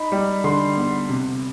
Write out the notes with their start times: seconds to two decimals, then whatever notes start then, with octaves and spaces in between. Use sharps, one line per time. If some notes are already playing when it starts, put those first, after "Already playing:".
Already playing: D#4 B5
0.12 G3
0.44 D3 C6
0.77 B3
1.09 C3